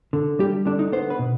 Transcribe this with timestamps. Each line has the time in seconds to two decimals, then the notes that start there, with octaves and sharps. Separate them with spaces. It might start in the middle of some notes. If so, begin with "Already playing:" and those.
0.13 D3
0.39 G3 G4
0.65 D3 D4
0.79 D#4
0.92 B3 C5
1.10 B4
1.19 B2